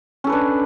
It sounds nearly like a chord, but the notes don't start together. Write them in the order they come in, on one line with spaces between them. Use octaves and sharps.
C#4 A4 B4 D4